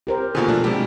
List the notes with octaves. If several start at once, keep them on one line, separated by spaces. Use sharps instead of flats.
G4 A#4 C5
B2 D3 A#3 F4 G#4
B2 F3 A3 D4
C3 G3 G#3 B3 G4